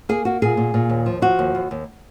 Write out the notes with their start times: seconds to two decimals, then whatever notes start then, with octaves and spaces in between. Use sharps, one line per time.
0.09 A#3 G#4
0.25 A#3 F#4
0.42 A#2 G#4
0.57 A#2
0.74 A#2
0.90 D#2
1.06 F3
1.22 F3 F#4
1.39 D#2
1.55 D#2
1.71 D#2